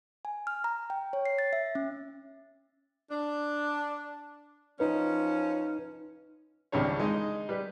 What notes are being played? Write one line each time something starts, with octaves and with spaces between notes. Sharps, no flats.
G#5
F6
A#5
G5
C#5
C7
A6
E5
C#4
D4
F3 C#4 D#4 B4
G#1 C#2 E3 G3 D4 C#5
G#3 D#4
G3 B4